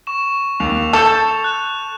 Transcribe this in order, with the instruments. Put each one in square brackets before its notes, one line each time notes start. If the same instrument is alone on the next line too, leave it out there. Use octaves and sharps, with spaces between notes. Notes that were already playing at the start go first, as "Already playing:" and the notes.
[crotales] C#6 E7
[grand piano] D#2 [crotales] F7
[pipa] A4 [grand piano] A5 G6
[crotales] F#6